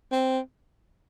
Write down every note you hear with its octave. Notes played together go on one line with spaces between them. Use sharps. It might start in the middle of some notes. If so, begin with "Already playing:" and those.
C4